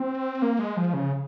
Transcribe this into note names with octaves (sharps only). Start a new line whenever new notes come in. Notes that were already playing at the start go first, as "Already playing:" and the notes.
Already playing: C4
A#3
G#3
F3
C#3